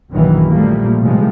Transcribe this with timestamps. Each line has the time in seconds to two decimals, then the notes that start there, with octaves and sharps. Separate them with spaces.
0.10 A#1 F#2 D#3 E3 F#3
0.50 A#2 F3 G3 A3 A#3
1.00 A2 C3 D#3 F3 G3 G#3